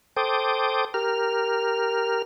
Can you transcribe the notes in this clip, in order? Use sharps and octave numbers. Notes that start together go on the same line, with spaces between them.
A4 C5 G5 D6 D#6
G4 A#4 F6